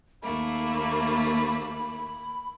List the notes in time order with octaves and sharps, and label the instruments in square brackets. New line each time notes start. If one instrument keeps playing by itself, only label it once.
[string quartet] D#2 A3 A#3 [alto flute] B5